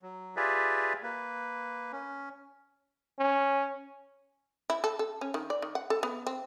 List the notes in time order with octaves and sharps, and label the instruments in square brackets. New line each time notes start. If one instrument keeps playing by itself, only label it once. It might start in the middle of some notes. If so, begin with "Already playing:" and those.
[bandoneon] F#3
F4 G4 G#4 B4 D5 E5
A#3 B4
C#4
[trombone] C#4
[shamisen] E4
A4
A4
C#4
D#3
D5
D#3
F#5
A4
B3
C4